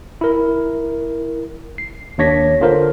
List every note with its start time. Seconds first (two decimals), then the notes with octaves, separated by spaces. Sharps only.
0.21 E4 A#4
1.78 C7
2.18 D#2 D4 C#5 A#6 B6
2.61 D3 F4 A#4 C5